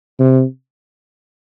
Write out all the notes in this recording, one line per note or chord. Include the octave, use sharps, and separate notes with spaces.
C3